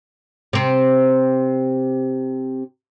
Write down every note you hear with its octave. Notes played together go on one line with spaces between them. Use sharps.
C3 C4